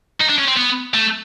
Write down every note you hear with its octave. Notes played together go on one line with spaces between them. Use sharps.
D#4
D4
C#4
C4
B3
A3